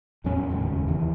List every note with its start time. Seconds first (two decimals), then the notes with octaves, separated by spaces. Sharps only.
0.24 E2 A2 F#3 C#4
0.49 F1 D#2 G#2 C#3
0.88 D#2 E3